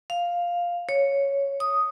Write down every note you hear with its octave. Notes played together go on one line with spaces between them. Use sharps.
F5
C#5
D#6